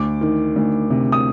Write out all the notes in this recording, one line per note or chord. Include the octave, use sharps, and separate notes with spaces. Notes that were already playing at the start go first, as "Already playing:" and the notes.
Already playing: D2 D6
D#3
D2
C3
D#6